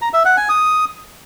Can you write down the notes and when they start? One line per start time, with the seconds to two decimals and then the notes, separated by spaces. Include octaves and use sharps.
0.02 A#5
0.13 E5
0.25 F#5
0.37 G#5
0.49 D#6